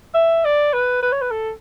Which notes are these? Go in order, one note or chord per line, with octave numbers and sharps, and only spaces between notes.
E5
D5
B4
B4
C#5
B4
A4